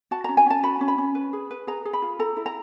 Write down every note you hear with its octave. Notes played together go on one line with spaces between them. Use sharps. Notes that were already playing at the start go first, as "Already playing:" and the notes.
F#4 A5
A#5
C#4
G#5
C#4 A5
F#4 B5
C#4
B5
C#4
B4
G#4
B4
G#4 A#5
G#4
B5
F4
A4 A#5
E4
A#5